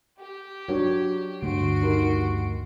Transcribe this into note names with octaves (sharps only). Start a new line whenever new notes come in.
G4
F#3 D4 C#5
D2 G2 D3 A3 F#4 C6 D7
D#3 G4 A#4